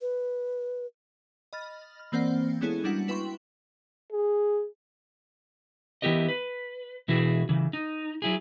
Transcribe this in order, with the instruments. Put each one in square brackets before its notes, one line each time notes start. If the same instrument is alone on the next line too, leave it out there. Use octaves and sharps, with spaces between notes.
[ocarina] B4
[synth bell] D#5 B5 F6 A6
F6
E3 A#3 C4 C5 D5 F#5
G#3 B3 C#4 E4 G#4 A4
G3 A#3 D4 E4 F#4 F#5
E4 B4 G5 C6 C#6
[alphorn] G#4
[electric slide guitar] E3 B3 E4 G4 A#4 D#5
B4
B2 E3 E4 F#4 G#4
C#3 E3
D#4
F#3 E4 G#4